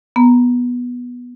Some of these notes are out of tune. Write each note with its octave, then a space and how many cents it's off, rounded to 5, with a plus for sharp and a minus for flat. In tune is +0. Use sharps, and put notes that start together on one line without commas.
B3 -10 A#5 +0